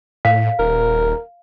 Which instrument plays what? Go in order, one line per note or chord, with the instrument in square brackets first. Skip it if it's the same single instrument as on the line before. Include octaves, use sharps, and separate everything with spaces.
[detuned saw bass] A2 [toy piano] F5
[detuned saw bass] D#1 [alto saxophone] A#4